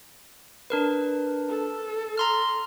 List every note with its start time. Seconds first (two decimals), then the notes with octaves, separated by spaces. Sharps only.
0.70 D4 A#4 B4
1.49 A4
2.18 A#5 C6 F6